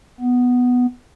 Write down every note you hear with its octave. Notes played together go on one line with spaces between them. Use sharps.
B3